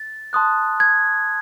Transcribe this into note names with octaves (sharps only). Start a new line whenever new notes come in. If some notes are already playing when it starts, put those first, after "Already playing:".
Already playing: A6
A5 C6 D#6 F#6
G#6